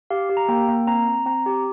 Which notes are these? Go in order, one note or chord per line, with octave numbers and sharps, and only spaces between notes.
G4 F5
G4
A#5
A#3 G5
A#3
C4 A#5
C4
C4 A#5
G4